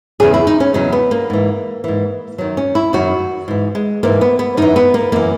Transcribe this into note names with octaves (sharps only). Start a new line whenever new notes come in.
E2 C#3 F#3 G#4
E4
D#4
C#4
E2 C#3 F#3 D#4
B3
A#3
G#2 E3
G#2 E3
F#2 D#3 F#3
C#4
E4
F#2 D#3 F#3 F#4
G#2 E3
G#3
G#2 E3 A#3
B3
B3
F#2 E3 D#4
B3
A#3
F#2 E3 A#3